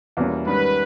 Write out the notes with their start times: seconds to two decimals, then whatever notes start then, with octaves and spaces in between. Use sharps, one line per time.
0.17 E2 B2 G3 A#3 C#4
0.46 G#2 D#3 G3 C#4 B4